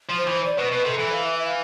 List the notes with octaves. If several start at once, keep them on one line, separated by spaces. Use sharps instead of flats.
F3
C5
E3
D5
B2 B4
B2 B4
C3 A4
E3 A4
F5
E5
E5
F5